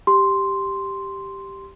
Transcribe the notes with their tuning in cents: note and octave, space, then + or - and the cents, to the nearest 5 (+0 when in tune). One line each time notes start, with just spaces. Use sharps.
G4 +0 C6 +0